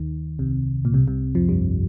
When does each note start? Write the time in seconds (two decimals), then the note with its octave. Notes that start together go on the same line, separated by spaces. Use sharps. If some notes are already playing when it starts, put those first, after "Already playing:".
Already playing: D#2 D#3
0.39 C2 C3
0.85 A#2
0.94 C2 C3
1.08 C2 C3
1.35 F2 F3
1.49 G2 G3